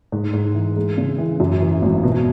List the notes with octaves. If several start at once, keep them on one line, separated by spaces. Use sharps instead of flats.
G#2
G#2
E3
G#3
C#3
E3
F#2
E3
G#1
B2